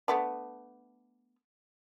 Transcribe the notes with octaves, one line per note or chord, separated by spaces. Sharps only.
A3 B3 D4